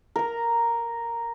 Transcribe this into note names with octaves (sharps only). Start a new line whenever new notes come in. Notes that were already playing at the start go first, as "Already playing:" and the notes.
A#4 A#5